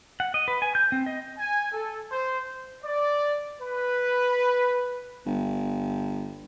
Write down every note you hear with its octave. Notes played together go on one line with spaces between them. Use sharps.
F#5
D#5
B4
G#5
G6
C4
D#5
G#5
A4
C5
D5
B4
G1